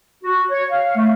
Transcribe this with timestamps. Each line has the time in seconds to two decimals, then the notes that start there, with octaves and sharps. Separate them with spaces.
0.24 F#4
0.51 C#5
0.70 F5
0.96 A3